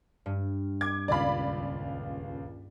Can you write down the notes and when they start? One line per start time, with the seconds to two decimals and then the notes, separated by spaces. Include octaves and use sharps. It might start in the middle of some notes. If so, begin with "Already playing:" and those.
0.26 G2
0.81 D6 G#6
1.08 D#1 C#2 D5 F5 B5